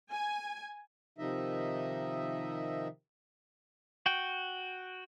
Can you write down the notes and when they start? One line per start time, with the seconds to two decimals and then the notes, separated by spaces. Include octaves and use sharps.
0.12 G#5
1.18 C3 D#3 F3 D#4 D#5 E5
4.06 F#4 G5